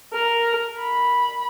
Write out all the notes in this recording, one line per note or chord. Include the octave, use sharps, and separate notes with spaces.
A#4
B5